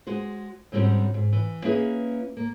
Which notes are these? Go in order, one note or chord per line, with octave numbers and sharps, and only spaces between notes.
G#3 F#4 C5
G#2 D3 G3 C4 C#4 F#4
G#2
E3
A#3 C#4 E4 G#4 B4
A#3